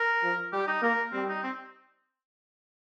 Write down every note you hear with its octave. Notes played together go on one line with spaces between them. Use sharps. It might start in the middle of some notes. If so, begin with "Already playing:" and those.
Already playing: A#4
F3
G3 G4
D#4
A#3 A#4
G3 C4
D#4
C4